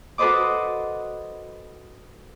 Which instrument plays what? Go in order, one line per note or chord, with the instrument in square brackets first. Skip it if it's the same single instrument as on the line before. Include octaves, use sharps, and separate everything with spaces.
[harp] F#4 A4 B4 C5 D#5 D6